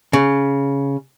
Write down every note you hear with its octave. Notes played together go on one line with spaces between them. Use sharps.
C#3